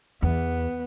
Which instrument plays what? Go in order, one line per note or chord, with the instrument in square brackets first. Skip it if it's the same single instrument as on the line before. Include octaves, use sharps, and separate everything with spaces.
[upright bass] E2 [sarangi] B3